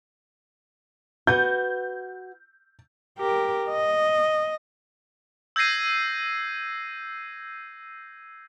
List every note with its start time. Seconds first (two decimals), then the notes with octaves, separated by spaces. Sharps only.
1.27 F#4 B4 G6
3.19 G4 A#4
3.70 D#5
5.56 E6 G6 G#6 A#6 C7 D#7